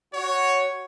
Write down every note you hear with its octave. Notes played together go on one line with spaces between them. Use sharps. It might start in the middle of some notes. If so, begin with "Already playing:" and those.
F#4 C#5